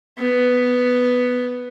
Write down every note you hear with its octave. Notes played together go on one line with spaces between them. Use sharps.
B3